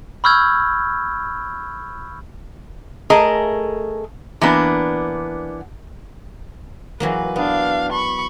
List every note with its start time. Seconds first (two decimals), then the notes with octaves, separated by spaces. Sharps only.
0.24 B5 C#6 E6 F6 G6 G#6
3.10 A3 G#4 A#4 D#5
4.41 E3 A#3 B3 D4
7.00 E3 F#3 A#3 B4
7.36 B3 D4 F5
7.92 B5 C#6